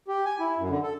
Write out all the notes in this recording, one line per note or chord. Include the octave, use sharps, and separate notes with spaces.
G4
G#5
E4
F#2
D3
A4